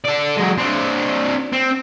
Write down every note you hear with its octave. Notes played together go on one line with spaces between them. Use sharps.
A4 D5
F#3 G#3
C4 D4
C4